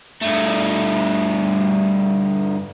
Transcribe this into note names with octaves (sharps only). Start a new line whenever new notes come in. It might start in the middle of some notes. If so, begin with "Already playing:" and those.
G2 A3